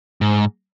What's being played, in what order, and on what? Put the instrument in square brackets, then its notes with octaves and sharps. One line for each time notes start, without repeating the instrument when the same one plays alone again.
[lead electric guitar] G#2